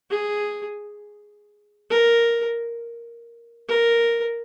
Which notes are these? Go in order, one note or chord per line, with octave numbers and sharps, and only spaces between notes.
G#4
A#4
A#4